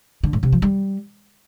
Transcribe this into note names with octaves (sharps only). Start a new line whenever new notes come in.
D3
A2
C3
F3
G3